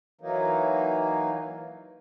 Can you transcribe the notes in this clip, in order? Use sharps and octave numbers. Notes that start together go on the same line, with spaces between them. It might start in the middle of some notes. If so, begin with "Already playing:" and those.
E3 F#3 A#3 D#4